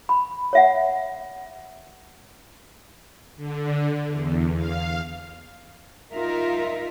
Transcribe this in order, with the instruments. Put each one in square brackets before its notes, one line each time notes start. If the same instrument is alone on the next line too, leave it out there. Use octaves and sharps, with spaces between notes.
[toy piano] B5
C#5 E5 F#5
[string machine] D3
E2
F5
[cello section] D#4 F4 A#4 E5